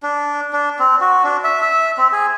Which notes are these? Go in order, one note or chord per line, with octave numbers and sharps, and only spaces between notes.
D4
D4
C4
F#4
D4
E5
E5
C4
G#4